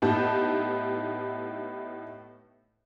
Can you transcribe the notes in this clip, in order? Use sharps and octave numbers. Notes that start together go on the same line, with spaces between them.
A2 B3 D#4 G4 A5 G6